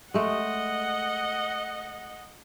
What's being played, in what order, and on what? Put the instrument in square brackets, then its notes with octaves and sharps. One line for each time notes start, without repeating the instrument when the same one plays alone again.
[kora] G#3 A3 [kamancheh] D#5 F#5